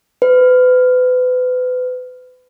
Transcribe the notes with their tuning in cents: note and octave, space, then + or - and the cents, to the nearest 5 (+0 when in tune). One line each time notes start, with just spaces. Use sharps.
B4 +35